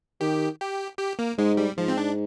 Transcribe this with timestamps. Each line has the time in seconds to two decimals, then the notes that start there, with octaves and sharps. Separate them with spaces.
0.21 D#3 G4
0.60 G4
0.99 G4
1.19 A#3
1.38 G#2 G#3
1.57 G3
1.77 G#2 F3
1.88 C4
1.97 D4